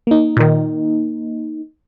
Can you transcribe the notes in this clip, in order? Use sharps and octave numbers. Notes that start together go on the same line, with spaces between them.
A#3 D#4
A#2 D#3